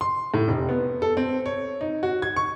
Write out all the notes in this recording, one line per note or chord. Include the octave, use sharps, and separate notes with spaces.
C6
A2
F1
B3
A4
C4
C#5
D#4
F#4
G#6
C#6